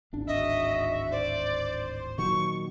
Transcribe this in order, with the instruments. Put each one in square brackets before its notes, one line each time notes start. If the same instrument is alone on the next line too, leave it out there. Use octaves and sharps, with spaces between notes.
[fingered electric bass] D1 G#1 D4
[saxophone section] G#2 F#4 E5 [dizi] D#5
[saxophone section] C5 [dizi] D5
[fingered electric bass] A#2 D#3 F#3 [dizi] C#6